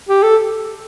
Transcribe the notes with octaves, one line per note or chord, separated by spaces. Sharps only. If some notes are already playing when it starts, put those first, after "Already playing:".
G4
A4